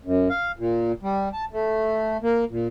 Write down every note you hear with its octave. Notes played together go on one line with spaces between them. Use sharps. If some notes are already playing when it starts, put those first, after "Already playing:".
F#2
F5
A#2
G3
A5
A3
A#3
A#2